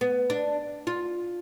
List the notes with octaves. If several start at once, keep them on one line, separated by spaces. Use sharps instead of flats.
B3
D4
F4